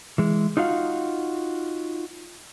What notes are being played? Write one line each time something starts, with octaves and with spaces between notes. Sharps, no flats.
E3 G#3
D#4 F4 F#4 F5